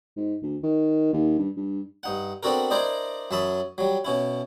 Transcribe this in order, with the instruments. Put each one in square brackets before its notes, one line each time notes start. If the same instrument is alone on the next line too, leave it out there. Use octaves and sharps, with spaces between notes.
[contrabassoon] G#2
D2
D#3
D#2
G2
G2
[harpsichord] G2 D#4 F#5
B3 C4 D4 F#4 A4 A#4
D4 E4 A#4 C5 D5 D#5
F#2 F#3 E5 A5 B5 D#6
F#3 G3
B2 C#4 E4